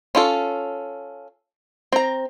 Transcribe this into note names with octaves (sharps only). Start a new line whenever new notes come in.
C#4 F4 A4
C4 A#5